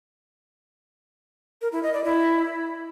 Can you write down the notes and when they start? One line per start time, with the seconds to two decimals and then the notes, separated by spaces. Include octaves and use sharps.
1.62 A#4
1.72 E4
1.83 D#5
1.94 D5
2.04 E4